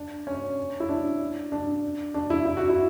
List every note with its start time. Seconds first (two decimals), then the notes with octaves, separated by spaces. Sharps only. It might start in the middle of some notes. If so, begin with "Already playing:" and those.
Already playing: D4
0.27 C#4
0.80 E4
0.89 D4
1.52 D4
2.14 D4
2.30 E4
2.46 E4
2.57 F#4
2.69 E4